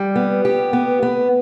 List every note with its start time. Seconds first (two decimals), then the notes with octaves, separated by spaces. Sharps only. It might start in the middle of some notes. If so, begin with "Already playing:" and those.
Already playing: G3
0.16 B3
0.45 G4
0.73 B3
1.03 B3